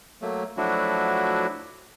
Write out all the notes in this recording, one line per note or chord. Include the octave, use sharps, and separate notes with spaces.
F#3 A3 A#3
F3 F#3 A3 D4 E4 F#4